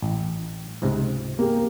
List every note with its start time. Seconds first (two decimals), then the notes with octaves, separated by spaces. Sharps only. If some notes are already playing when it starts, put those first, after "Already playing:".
0.02 A1
0.82 C#2 G#2 C3
1.39 A#3 G4 G#4